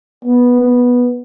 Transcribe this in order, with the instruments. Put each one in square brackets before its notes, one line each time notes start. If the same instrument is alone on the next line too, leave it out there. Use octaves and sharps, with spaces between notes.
[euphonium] B3
B3